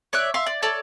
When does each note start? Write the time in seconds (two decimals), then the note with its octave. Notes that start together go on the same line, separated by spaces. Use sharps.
0.13 C#5 D5 E5 F#6
0.34 E5 F5 C6
0.46 D5
0.62 A4 C#5 D5